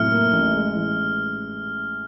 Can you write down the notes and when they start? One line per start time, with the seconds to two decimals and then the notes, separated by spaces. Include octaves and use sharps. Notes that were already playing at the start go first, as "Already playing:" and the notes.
Already playing: A2 C3 F#3 F6
0.12 A#3
0.33 A1
0.54 G#3
0.75 E3